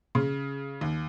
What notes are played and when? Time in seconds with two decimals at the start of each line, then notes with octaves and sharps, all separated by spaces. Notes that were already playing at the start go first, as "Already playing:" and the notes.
0.15 C#3
0.81 D#2